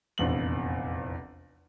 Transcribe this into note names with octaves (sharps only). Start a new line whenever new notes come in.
F1 A#1 E2 F#7